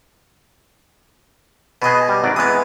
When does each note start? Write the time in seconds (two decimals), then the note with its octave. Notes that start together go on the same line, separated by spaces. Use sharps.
1.82 B2 G#4 B4 D#5
2.09 G3
2.24 G#1 F#3 D5
2.36 E3 G#3 B3 D#6